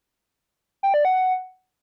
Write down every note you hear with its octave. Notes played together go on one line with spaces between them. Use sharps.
G5
D5
F#5